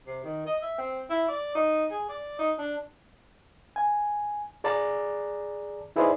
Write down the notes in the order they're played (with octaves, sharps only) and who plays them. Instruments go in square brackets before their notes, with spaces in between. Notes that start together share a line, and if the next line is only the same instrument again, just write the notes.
[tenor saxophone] C3
D#3
D#5
E5
C4
E4
D5
D#4
G#4
D5
D#4
D4
[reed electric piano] G#5
G#4 D5 A5 A#5 D6
D#4 E4 G#4 B4 C5 D5